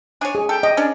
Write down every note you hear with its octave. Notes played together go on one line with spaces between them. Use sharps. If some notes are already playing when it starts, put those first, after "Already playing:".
D4 C#5 G#5
G#4
A4 G5
G4 D#5
C#4 D4